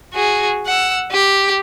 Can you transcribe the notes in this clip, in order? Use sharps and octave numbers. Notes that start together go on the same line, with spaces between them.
F#4 G#4
F#5 E6
G4